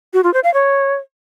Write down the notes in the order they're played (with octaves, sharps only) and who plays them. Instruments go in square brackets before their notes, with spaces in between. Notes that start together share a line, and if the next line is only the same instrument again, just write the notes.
[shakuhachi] F#4
F4
C5
F5
C#5